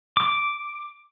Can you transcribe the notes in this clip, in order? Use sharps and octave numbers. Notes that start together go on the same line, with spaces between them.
D6